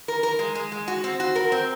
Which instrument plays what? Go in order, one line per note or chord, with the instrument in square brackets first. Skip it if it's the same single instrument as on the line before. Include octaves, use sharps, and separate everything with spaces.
[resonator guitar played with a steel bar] A#4
A#4
G#3
G#3
G#3
F#4
C4
F#4
A#4
C4